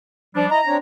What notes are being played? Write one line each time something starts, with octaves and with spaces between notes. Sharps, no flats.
F3 G3 D4
E4 D#5 A#5
C4 D4 C#5